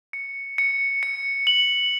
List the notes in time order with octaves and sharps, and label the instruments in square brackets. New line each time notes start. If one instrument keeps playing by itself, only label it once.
[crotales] C#7
C#7
C#7
F#7